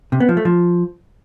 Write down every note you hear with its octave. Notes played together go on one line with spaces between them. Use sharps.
C3
B3
F3
A3
F3